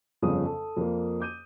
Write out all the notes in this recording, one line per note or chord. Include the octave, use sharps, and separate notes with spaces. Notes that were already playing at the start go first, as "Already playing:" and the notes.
G1 F2 C#3 D#6
A4
F2 A#3
D6 G6 D#7